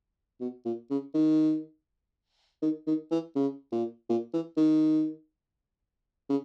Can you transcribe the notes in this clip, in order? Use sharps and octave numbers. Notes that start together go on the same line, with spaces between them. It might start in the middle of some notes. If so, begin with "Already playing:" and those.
B2
A#2
C#3
D#3
D#3
D#3
E3
C#3
A#2
A#2
E3
D#3
C#3